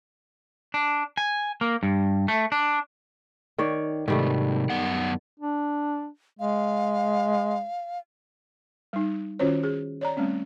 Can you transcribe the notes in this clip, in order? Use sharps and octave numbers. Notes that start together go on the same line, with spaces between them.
D4
G#5
A#3
G2
A3
D4
D#3 C#5 D5
G#2 C3 D#3 G3 A3
F#2 B3 F#5
D4
G#3 F5
G3 D#4
D#3 C#4 F4 F#4 C5 C#5
G#4
C#5 D5 A#5
G3 A3 C4 C#4